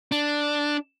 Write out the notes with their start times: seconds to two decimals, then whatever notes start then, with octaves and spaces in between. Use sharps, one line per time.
0.12 D4